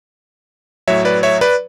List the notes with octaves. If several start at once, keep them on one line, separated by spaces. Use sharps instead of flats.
A2 F#3 C#5 E5
B4 D5
C#5 E5
B4 D5